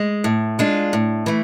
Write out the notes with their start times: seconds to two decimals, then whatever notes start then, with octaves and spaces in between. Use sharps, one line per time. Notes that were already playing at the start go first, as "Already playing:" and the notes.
Already playing: G#3
0.24 A2
0.59 G#3 D4 F4
0.93 A2
1.26 E3 A3